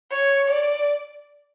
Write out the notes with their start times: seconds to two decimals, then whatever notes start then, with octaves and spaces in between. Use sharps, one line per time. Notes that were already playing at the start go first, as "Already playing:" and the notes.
0.11 C#5
0.50 D5